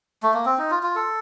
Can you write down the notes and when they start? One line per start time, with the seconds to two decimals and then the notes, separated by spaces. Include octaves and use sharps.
0.23 A3
0.34 A#3
0.46 C4
0.58 D#4
0.71 F4
0.83 F4
0.96 A4